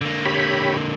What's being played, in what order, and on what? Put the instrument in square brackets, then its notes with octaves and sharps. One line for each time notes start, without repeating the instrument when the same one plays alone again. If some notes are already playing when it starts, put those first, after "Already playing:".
[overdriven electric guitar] D3 A#3
[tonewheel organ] G4 C#5 B5